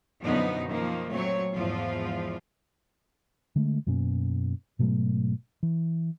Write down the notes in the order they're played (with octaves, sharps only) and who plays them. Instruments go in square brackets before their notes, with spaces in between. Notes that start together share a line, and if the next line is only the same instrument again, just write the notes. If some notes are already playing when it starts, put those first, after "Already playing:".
[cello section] F#2 B2 D3 F3 B3 D#4
D#3 F3 A#3
A#2 F#3 A3 C4 C#5
E2 G#2 F3 F4
[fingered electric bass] D3 G#3 A3
F#2 B2 A#3 C#4
G#2 B2 F#3 A3
E3